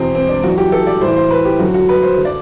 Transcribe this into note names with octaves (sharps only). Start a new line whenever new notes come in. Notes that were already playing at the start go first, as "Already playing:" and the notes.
Already playing: E2 B2 C4
C4
D4
F#2 E3 F#4
G4
A4
D5
A2 E3 C5
C5
B4
G4
F#2 D3 F#4
F#4
B4
C5
D3
D5